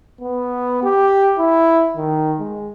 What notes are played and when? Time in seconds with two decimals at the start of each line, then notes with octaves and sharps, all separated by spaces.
0.21 B3
0.83 G4
1.38 E4
1.97 D#3
2.40 G#3